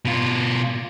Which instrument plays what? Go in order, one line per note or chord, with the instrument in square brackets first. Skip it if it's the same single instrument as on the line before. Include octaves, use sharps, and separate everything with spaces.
[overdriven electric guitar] B2 F4